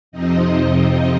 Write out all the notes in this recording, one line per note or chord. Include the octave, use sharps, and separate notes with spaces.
F2 C3 F3 C4 D#4 D#5